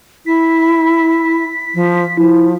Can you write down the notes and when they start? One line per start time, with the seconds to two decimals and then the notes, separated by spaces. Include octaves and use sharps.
0.26 E4 B6
1.75 F3
2.17 F3 E4